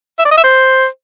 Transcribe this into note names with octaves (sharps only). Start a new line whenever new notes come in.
E5
D5
D#5
E5
C5